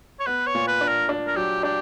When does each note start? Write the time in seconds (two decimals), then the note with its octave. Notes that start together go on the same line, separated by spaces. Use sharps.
0.20 C#5
0.26 B3 B4
0.47 C#5
0.55 A#2
0.68 B4
0.81 D4
0.88 A#4
1.09 D4
1.27 A#4
1.36 F#3 G4
1.63 D4 G4